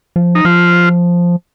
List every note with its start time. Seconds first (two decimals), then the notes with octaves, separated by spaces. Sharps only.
0.16 F3
0.35 D#4
0.45 F3 F4